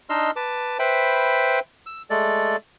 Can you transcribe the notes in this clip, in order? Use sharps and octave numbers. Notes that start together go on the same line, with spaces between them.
D4 D#4 D#5 C6 E6 F6
B4 A5 D6
B4 C5 E5 G5 B5
E6
G#3 A3 A4 D5